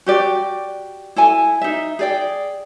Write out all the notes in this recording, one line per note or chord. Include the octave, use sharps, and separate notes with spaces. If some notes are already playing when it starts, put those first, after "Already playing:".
F#4 G4 D5
E4 A4 G#5
D#4 E5
G#4 D5 G5